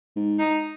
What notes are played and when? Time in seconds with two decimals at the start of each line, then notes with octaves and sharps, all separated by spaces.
0.16 G#2
0.39 D#4